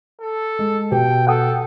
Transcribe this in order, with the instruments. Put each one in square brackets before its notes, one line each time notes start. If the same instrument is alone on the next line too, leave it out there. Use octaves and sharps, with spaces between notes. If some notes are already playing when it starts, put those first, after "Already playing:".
[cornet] A4
[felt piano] G#3
[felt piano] B2 [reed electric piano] G4 [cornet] G5
[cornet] A4 [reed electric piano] F#5 G5 D#6